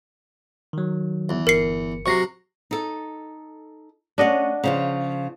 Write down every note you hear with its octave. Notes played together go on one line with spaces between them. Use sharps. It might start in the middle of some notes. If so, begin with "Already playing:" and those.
D#3 F#3
E2
G1 A#4 C7 C#7
C3 F#3 C#6 A#6 C7
D#4 A4
A3 C#4 D4 D#5 F#5
C#3 F3 F4